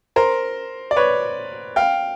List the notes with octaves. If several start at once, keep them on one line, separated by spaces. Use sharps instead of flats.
A#4 C5
D5
B4 C#5
F5 G5